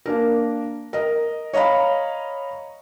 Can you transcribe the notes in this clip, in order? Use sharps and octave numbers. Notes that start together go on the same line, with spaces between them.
A#3 D4 A#4
A#4 D#5
C#5 D#5 F5 A#5 B5